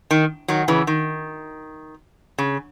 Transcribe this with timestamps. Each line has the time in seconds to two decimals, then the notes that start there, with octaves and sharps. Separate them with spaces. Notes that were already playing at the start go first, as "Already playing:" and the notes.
0.11 D#3
0.48 D#3 F#3
0.68 C#3 E3
0.87 D#3
2.38 C#3